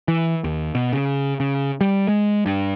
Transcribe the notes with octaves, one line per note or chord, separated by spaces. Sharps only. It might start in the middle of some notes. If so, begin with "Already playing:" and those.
E3
D#2
B2
C#3
C#3
G3
G#3
G2